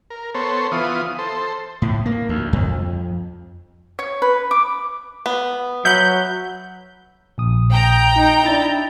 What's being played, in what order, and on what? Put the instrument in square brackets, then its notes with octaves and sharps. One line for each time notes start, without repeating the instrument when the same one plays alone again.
[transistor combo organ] A#4
B3 A4 C5 C#5
E3 B3 F4 D#6
A4 C5
[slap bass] A2
A#3
D2
F2
[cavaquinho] C#5
B4
D6
[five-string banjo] B3
[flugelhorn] F#3 [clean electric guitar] E5 F#5 B5 [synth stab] G6
[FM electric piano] A#1 D#6
[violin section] G5 A#5 G6
[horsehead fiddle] D#4
[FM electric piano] D4 A6 [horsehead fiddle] E4